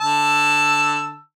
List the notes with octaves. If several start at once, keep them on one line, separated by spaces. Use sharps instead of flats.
D3 A5 E6